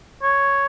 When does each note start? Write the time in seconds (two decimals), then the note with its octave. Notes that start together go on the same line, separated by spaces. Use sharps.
0.22 C#5